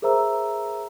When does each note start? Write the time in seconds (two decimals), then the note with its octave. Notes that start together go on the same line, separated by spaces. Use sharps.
0.02 G#4 A#4 C5 E5 A#5 E6